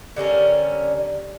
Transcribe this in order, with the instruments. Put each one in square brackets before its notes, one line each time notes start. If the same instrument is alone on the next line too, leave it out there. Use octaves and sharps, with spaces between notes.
[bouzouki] D3 G3 C#4 A#4